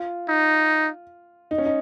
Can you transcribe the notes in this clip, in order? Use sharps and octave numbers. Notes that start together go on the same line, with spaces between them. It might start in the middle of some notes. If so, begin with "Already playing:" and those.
Already playing: F4
D#4
D#4
C#4
D#4